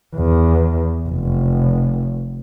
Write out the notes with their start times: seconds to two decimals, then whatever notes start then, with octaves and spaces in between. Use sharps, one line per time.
0.16 E2
1.07 F1